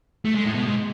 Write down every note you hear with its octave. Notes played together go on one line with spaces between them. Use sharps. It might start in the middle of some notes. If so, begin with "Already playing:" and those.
A3
G#3
A2
B2
G#2